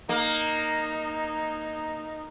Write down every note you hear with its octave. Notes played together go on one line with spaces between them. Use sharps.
A#3 D#4